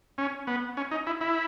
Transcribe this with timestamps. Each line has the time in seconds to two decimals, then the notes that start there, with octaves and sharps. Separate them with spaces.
0.18 C#4
0.47 B3
0.77 C#4
0.91 D#4
1.07 E4
1.21 E4